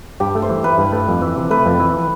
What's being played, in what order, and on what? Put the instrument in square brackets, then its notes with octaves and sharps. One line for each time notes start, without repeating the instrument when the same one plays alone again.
[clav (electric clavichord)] G2 [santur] G4
[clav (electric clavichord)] A3
[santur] C5
[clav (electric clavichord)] E3
[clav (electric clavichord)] E4 [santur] B4
[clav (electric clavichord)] G2
A3
F2
E3
C3
[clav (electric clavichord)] A3 [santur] B4
[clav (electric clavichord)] F2
E3